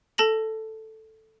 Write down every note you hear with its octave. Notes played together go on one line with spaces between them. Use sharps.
A4 A5 A#6 F#7